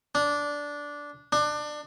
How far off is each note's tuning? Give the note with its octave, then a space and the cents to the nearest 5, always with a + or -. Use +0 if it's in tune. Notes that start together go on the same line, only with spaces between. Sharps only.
D4 -10
D4 +25